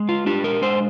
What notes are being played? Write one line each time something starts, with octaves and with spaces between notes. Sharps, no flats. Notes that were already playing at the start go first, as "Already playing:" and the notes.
Already playing: G#3
F4
D4 G4
A#4
G#3 C5